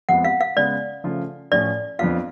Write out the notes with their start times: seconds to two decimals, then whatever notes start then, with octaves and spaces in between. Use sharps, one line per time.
0.09 F2 F3 G#3 B3 F#5
0.24 F5
0.40 F5
0.56 C#3 G#3 B3 D5
1.04 C#3 F3 A3 F4
1.52 A2 F3 A3 C#4 D5
1.99 F2 F3 B3 D4 F4 F5